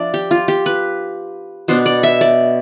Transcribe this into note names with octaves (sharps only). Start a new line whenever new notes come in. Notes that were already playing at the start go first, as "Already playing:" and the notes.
Already playing: F3 D4 D5 E5
G4
F4
G4
B4
B2 B3 D4 C5
D5
E5
D5